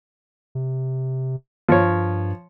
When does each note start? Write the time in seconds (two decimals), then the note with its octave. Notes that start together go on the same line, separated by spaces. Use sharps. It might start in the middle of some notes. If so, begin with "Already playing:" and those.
0.55 C3
1.69 G2 F3 C#5